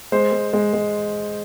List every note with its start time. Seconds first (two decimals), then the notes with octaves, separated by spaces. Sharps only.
0.12 G#3 C5
0.32 G#3
0.53 G#3
0.73 G#3